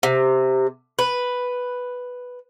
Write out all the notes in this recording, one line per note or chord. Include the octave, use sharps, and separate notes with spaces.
C3
B4